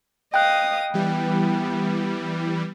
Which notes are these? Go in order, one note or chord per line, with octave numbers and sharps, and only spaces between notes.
D#5 F5 G5 D#6 F#6
E3 G3 B3